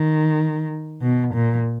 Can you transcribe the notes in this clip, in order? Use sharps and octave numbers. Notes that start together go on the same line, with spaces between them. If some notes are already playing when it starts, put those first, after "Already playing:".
Already playing: D#3
B2
A#2